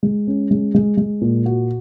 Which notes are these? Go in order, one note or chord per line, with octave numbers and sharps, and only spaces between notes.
G#3
C#4
G#3
G#3
G#3
A#2
F#4